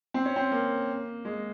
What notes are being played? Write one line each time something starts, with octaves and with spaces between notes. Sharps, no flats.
C4
C#4
C4
A#3
G#3